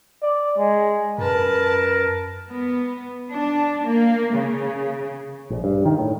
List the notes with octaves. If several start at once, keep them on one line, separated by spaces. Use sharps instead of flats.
D5
G#3
F#2 A#4 B4 A5
B3
D4
A#3
C#3
A#1
G2
D#3
A2